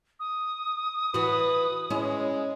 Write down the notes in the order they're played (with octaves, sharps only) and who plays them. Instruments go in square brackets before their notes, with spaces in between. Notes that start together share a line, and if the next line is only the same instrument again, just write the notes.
[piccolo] D#6
[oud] E3 F#4 [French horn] B4
[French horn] G#3 [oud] C#4 E4